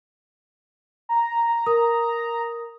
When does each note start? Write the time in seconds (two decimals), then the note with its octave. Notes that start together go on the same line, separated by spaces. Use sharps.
1.09 A#5
1.66 A#4 D#6